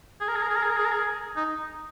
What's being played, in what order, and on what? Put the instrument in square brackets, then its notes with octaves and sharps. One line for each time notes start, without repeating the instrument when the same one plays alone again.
[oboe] G#4
A#4
G#4
A#4
G#4
A#4
G#4
A#4
G#4
A#4
G#4
D#4